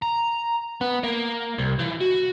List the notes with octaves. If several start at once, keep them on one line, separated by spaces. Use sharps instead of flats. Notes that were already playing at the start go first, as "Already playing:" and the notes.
A#5
B3
A#3
C2
E3
F#4